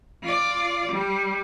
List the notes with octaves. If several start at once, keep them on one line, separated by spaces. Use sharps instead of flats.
F4 D5
G3